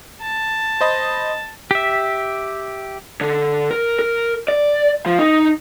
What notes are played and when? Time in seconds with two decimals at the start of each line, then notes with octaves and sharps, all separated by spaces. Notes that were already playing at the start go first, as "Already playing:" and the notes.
0.23 A5
0.81 C5 D#5 B5
1.71 G4 E5
3.21 D3
3.71 A#4
3.99 A#4
4.48 D5
5.06 F3
5.19 D#4